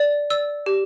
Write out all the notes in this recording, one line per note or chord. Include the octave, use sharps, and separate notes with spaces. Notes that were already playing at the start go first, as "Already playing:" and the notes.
Already playing: D5
D5 E6
G4